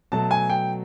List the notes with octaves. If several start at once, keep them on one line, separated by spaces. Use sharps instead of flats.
B2 F#3 A3 A5
G#5
G5